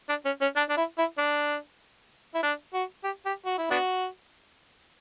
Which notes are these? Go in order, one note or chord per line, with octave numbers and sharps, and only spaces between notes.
D4
C#4
C#4
D4
D4
E4
E4
D4
E4
D4
F#4
G4
G4
F#4
E4
B3 D4 F#4